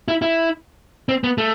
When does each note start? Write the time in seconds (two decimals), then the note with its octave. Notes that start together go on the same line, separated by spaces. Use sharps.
0.08 E4
0.22 E4
1.09 C4
1.24 B3
1.38 A3